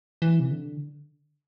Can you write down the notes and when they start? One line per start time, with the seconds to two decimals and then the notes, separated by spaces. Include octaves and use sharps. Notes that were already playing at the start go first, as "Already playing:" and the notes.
0.22 E3
0.40 C3
0.51 D3